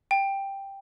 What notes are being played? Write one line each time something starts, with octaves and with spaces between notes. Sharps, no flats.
G5